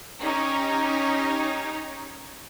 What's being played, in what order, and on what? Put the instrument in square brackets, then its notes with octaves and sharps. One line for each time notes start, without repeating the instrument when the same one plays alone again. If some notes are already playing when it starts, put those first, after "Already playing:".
[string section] C#4 D#4 G4